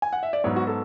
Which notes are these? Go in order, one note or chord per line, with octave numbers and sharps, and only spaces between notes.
G#5
F#5
E5
D5
G#2 F#3 B3 C#5
F#4
A4